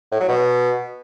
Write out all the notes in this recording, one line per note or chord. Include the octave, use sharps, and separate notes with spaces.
A2
F#3
B2